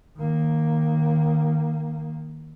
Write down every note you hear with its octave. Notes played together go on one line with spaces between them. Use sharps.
D#3 A#3